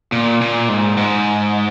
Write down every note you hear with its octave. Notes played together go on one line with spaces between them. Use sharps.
A#2
A#2
G#2
G#2